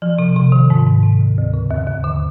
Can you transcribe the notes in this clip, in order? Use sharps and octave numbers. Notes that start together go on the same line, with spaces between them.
F3
C3
C3
D#3
G#2
G#2
C3
D2
D2
C#3
D#2
D#2
D3